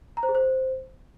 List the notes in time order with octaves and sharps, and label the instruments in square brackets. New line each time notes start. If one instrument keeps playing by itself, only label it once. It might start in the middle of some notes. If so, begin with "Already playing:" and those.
[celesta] A#5
C5
G#4
C5